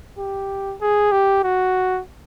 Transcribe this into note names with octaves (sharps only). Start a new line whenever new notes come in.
G4
G#4
G4
F#4